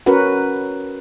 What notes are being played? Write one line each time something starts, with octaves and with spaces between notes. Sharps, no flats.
C#4 F#4 A#4 B4 F#5